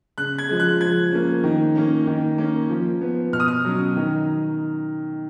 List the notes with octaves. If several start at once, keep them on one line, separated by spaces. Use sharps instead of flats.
C#3 F#6
G#6
F3 G#3
F#6
F3 G#6
A#3 C#4
D#3
A#3 C#4
D#3
A#3 C#4
F3
B3
B2 F6
D#6
F6
F#3 C#4
D#3